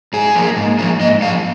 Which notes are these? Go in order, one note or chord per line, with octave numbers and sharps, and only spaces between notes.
G#2 G#4
F3 A#3
G#2
F3 A#3
G#2 D#5
F3 A#3 F5